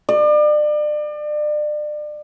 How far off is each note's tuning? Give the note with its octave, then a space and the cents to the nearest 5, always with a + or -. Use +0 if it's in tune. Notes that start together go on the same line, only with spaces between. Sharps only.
D5 +35